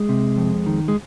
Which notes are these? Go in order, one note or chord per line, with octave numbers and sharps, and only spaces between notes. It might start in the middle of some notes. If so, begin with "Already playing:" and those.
Already playing: G#3
C3
F2
D#3
G#3